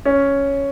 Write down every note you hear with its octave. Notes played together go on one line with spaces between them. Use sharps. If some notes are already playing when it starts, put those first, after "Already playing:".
C#4